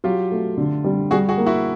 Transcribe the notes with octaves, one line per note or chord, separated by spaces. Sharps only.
F#3 F4 G4
A3
D3
G3
G3 F#4 G#4
F#4 G#4
A#3
E4 F#4